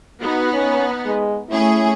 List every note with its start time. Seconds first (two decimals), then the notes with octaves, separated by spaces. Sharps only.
0.21 B3 D#4 F#4
0.53 C#4
1.06 G#3
1.50 A3 C#4 E4 G#4